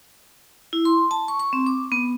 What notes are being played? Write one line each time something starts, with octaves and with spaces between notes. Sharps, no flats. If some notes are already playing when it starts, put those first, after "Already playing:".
E4
C6
A5
C#6
C#6
C4
D6
B3